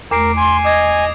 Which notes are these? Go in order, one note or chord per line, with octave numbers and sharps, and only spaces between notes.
E2 A3 A#4 D6 C7 D7
G#5 C6
D#5 D6 D#6 G#6